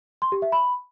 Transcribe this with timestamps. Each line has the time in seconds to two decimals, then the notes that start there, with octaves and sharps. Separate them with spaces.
0.22 C6
0.32 G4
0.42 E5
0.52 B5